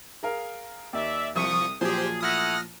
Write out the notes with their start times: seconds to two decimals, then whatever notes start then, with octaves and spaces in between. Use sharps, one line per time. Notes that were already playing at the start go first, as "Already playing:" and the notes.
0.23 G#4 A#4 F5
0.93 D#2 D5 E5
1.36 C2 F3 E5 C#6 D#6 C#7
1.81 A#2 F3 F#3 G4 G#4 C5
2.21 A3 E4 F#5 D#6 F6 A#6